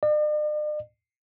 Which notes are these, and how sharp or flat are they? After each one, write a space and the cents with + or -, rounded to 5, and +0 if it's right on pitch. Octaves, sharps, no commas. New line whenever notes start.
D5 +45